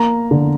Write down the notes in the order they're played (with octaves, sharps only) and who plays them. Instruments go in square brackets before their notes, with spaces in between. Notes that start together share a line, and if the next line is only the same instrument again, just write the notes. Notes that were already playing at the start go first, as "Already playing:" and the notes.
Already playing: [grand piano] A#3 A#5
D3